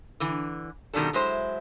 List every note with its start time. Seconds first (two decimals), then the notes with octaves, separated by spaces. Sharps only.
0.20 D3 E3
0.93 F#2 B2 D#3 G3 D4 A4
1.13 F#3 G#3 E4 C5